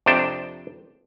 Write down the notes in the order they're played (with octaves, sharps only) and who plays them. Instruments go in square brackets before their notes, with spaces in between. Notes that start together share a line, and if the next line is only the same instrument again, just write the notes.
[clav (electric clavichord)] F2 C3 D4 G5 A5